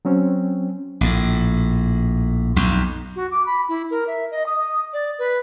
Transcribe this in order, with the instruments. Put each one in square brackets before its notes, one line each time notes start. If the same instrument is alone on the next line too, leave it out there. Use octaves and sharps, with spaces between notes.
[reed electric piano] F#3 C4 C#4
[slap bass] A#1 A2
B1 F2
[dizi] F#4
D6
B5
E4
A#4
E5
D#5
D#6
D5
B4